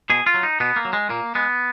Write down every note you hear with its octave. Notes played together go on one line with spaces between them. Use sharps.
B2 G#4
F4
F#3
D#4
B2 B3
A#3
F#3
G#3
A#2 A#3
G#3 B3